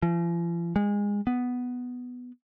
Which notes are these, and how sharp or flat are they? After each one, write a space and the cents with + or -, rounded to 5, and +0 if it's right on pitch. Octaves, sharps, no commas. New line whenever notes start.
F3 -45
G#3 -25
B3 +5